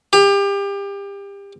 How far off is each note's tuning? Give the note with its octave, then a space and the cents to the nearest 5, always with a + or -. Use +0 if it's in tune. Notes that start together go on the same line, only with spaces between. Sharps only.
G4 +30